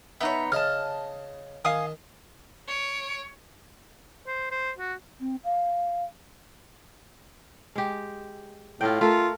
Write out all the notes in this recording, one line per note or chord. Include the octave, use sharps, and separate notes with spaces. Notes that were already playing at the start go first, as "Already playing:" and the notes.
B3 D#4 C#5 E5
C#3 D#5 A5 F6
D#3 F5 G#5 D#6
C#5 D7
C5
C5
F#4
C4
F5
G#3 G4
A2 F4 G5
A3 F4 A4 A#4